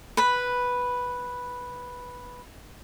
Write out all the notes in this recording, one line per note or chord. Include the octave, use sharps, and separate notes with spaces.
B4 B5